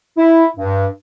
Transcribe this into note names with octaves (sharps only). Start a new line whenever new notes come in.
E4
G2